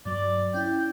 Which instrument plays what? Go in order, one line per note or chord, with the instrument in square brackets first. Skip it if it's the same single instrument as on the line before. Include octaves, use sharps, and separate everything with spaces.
[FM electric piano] G2 F#3 [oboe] D5
[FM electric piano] C#4 E4 G6 [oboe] G5